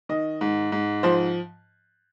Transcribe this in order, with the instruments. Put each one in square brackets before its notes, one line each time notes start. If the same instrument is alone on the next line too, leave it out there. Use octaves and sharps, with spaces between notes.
[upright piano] D#3 D#5
G#2
G#2
F3 C5